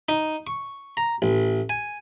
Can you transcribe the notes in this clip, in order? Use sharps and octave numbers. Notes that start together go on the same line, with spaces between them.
D#4
C#6
A#5
A1
G#5